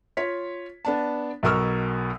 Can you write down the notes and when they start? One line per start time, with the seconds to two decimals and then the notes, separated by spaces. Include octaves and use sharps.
0.17 F4 C#5 B6
0.85 B3 D4 A5
1.43 B1 B2 A#4 C#6 E6 F6